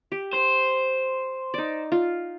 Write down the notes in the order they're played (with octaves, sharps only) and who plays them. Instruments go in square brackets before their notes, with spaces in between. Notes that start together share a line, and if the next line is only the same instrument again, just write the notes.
[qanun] G4
[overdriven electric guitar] C5
[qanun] D#4 D5
F4